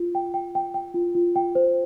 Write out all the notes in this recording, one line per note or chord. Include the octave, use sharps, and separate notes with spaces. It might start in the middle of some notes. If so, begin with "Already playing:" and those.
Already playing: F4
G5
G5
G5
G5
F4
F4
G5
C5